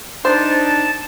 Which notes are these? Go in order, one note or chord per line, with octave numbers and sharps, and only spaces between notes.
D4 D#4 C5 A5